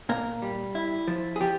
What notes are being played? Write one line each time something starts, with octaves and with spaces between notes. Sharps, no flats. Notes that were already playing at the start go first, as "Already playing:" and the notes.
A#2 A#3 A#4
G3
E4
F3
G#4
F3 G4